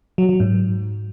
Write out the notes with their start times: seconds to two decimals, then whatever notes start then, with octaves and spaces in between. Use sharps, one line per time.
0.18 F#3
0.29 F#3
0.40 G#2